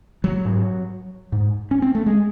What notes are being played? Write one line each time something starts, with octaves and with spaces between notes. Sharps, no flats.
F#3
G#2
G#2
C#4
C4
A3
G#3